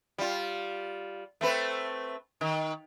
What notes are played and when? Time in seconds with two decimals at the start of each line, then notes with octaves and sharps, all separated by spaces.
0.18 G3 F4
1.41 A3 C4 B4
2.41 D#3